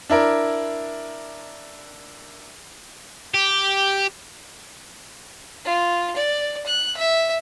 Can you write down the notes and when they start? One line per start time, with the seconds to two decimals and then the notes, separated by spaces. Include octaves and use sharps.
0.10 D4 E4 A#4
3.34 G4
5.65 F4
6.16 D5
6.66 F#6
6.97 E5